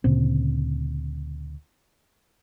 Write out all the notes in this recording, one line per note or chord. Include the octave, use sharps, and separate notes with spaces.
D2 A#2 C#3 C4